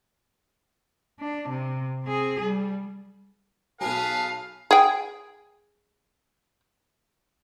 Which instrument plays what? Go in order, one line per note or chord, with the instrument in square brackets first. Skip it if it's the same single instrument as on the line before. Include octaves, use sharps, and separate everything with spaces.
[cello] D4
C3
C4 G#4
G3
[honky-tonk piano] B1 F#3 [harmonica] G#4 B4 [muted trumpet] F5 [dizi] A5
[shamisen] G#4 G5